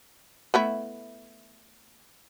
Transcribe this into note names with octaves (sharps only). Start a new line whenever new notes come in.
A3 B3 E4